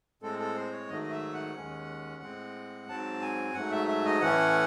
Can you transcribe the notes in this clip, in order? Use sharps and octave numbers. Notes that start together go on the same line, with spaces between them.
A2 G#3 C4 A4
A4
C5
C#5
G#2 D#3 F#3 A3 D#5
D#5
E5
F#5
D#2 D#3 G#3 C#4
A2 G#3 C4
G#2 F#3 C4 A5
G#5
G#2 F#3 A3 F#5
E5
E5
D#5
A2 E3 A3 C#4 F#5